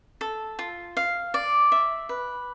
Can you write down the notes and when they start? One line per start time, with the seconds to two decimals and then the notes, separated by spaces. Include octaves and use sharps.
0.21 A4
0.59 F4
0.97 F5
1.34 D5
1.72 E5
2.09 B4